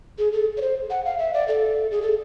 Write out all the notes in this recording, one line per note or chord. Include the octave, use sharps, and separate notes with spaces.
G#4
A4
C#5
C5
F#5
F5
E5
D5
A4
G#4
A4